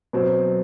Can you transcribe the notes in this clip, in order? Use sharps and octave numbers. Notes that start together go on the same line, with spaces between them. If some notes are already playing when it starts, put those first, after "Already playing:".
B2 F#3 C4